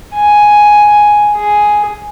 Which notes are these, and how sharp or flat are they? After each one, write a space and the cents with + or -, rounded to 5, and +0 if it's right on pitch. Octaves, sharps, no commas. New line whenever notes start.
G#5 +5
G#4 +5